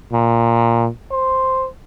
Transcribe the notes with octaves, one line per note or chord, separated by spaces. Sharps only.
A#2
C5